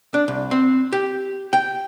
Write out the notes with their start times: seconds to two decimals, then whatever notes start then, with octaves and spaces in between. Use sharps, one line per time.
0.14 D4
0.28 C2
0.51 C4
0.93 G4
1.53 G5